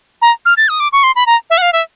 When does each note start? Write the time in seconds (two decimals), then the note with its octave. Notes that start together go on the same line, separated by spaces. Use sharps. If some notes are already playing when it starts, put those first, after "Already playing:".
0.22 A#5
0.45 F6
0.57 A6
0.69 D#6
0.80 D6
0.93 C#6
1.03 C6
1.16 B5
1.26 A#5
1.50 E5
1.58 F#5
1.62 F5
1.73 E5